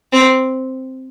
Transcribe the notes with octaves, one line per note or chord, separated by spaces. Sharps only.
C4